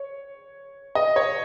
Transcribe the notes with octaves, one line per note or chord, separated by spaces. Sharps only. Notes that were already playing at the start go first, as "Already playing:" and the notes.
Already playing: C#5
D#5
C#5